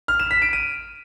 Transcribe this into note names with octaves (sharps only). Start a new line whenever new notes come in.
F6
E7
B6
D7
D#7